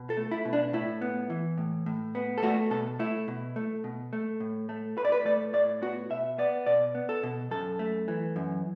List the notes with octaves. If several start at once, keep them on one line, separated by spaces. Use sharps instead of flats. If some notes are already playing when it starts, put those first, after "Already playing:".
Already playing: B2
A4
A3
E4
B2
D4
A2 E4
B3
E3
A2
A2
B3
A4
A3 F#4
B2 A4
A3 E4
B2
A3
B2
A3
A2
A3
A2 B4
D5
B4
A3 D5
A2 D5
B3 F#4
B2 E5
B3 D5
B2 D5
B3
A4
B2
F#2 A4
A3
E3
F#2